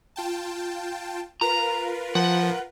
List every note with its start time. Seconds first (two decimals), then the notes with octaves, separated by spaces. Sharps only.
0.16 F4 G5 A5
1.41 F4 A#4 B4 A#5
2.15 F3 F#5